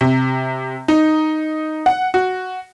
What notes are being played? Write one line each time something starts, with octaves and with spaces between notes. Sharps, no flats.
C3
D#4
F#5
F#4